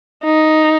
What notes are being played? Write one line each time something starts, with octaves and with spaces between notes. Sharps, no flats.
D#4